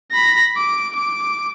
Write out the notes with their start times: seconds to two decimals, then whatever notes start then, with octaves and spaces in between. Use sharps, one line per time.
0.11 B5 A#6
0.57 D6
0.95 D6